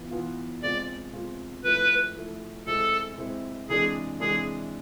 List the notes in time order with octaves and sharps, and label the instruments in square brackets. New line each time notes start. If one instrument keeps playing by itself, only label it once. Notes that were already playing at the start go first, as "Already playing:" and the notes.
Already playing: [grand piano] E3 B3 F4
E3 B3 F4
[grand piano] C3 G#3 C4 F4 [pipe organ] D5
[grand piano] C3 G#3 C4 F4
[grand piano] F3 A3 E4 [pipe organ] B4
[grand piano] F3 A3 E4
[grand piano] C3 G#3 C4 E4 [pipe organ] A4
[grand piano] C3 G#3 C4 E4
[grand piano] C3 E3 G#3 D4 [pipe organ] G#4
[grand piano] C3 E3 G#3 D4 [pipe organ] G#4